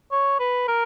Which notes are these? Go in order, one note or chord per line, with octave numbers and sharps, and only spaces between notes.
C#5
B4
A#4